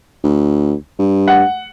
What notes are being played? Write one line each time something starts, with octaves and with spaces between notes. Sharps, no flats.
D2
G2
F#5